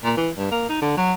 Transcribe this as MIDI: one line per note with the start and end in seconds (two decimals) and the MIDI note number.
0.04 0.13 46
0.17 0.30 52
0.37 0.49 43
0.51 0.67 58
0.69 0.77 63
0.82 0.94 50
0.97 1.13 54